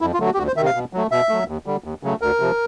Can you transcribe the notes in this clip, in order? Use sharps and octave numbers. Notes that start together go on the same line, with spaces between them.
F2 E4
F4
D3 F#3 A3
F#4
G4
D2 F#4
C5
C3 D#3 E5
F5
B2
F#3 A3
B2 E5
F#3 A3
D#2
D3 G3
D#2
C#3 F#3 A3
D2 A#4
C3 F3